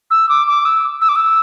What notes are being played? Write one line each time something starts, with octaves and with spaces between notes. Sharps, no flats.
E6
D6
D6
E6
E6
D6
E6